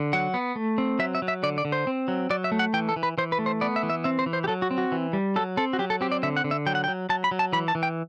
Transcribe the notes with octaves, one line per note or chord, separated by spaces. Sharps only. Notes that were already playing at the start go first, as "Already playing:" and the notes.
Already playing: D3
F#3 F#5
B3
A3
C4
F#3 E5
E5
F#3
E5
D3 D5
D5
D3
C5
C4
F#3
F#3 D5
E5
A3
F#5
E3 G5
A4
E3
B4
E3 C5
B4
A3
C5
B3 D5
E5
E3
E5
C4 E5
C5
E3
C5
G4
F#3 A4
F#4
C4
F#4
E3
G3
F#3 A4
C4 A4
F#4
F#3 G4
A4
C4 G4
D5
D3 E5
F#5
D3
E5
F#3 G5
F#5
G5
F#3
F#3 A5
B5
F#3
A5
E3 B5
A5
E3
G5